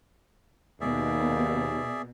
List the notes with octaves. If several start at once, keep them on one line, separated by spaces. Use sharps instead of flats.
D#2 B2 G#4 D5 E5